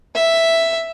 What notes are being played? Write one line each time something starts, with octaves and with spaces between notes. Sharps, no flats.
E5